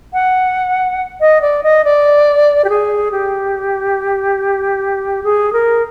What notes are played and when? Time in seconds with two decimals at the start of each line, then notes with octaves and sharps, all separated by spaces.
0.13 F#5
1.20 D#5
1.41 D5
1.63 D#5
1.84 D5
2.64 G4
2.69 G#4
3.11 G4
5.24 G#4
5.53 A#4